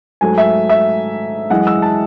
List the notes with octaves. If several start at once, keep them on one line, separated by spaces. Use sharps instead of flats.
G#2 F#3 A3 G#5
E5
E5
F#2 E3 G#3 F#5
E6
A5